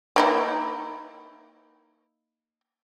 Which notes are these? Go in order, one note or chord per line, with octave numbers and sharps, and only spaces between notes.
A#3 D#4 E4